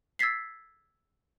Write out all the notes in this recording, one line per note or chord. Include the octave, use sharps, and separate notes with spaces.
E6 G#6 A6 B6 C7